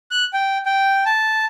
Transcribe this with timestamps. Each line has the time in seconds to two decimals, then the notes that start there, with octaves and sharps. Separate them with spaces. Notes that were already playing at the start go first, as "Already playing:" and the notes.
0.11 F#6
0.33 G5
0.65 G5
1.06 A5